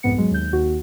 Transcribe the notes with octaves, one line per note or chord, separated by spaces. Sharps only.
C2 F2 G#2 B3 C#7
F#3 G#3
D#2 G6
D#2 F#4